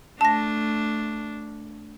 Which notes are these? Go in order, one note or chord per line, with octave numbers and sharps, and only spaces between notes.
A3 D4 A5 A#6